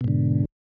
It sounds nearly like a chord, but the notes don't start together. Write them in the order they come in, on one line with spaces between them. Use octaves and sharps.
B2 G#2 D3